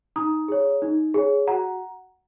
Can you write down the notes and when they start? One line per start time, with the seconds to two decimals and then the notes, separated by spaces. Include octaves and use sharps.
0.16 D#4 A#5 D#6
0.48 G#4 C#5
0.82 D#4
1.14 G#4 C#5
1.47 F#4 F#5 A#5